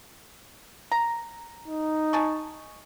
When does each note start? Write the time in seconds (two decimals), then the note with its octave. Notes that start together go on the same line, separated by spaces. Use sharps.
0.92 A#5
1.68 D#4
2.13 G#5 A5 C#6